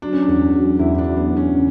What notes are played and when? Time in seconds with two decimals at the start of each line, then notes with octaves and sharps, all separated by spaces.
0.02 F#3 D4
0.13 C#4
0.22 D4
0.28 E2
0.54 F#3
0.79 E2 E4
0.94 E4
0.98 D4
1.04 F#3
1.16 B3
1.30 E2
1.37 C#4
1.55 C#3